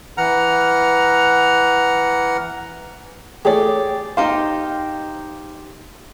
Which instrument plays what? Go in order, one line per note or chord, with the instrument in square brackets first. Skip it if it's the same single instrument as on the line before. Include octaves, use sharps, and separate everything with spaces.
[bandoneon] E3 F#5 A#5 F6
[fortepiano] A3 G#4 C#5 [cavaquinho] G4 D5
[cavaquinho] D#4 G4 C5 [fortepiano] F5 G5